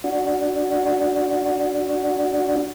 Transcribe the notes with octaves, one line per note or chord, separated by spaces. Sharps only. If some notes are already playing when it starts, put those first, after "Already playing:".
D4 F#4